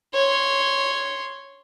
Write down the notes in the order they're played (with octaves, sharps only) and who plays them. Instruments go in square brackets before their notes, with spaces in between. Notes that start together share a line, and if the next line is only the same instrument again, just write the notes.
[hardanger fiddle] C#5 C6